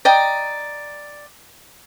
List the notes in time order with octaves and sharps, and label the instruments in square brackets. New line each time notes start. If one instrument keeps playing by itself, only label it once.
[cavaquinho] D5 D#5 G5 A#5